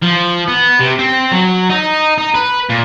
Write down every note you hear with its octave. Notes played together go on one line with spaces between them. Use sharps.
F3
B3
C3
C4
F#3
D#4
D#4
B4
A#2